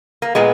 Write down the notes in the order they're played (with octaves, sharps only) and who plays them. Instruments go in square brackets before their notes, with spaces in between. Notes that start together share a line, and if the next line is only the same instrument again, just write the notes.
[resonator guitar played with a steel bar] A#3
A#2 G#3 B3